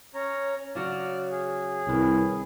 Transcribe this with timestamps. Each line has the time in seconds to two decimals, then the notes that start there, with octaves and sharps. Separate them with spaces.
0.15 C#4 C#5 A#5
0.75 C#3 F#3 F#4 D5 F6
1.31 G#4
1.88 C2 D#3 C#4 B4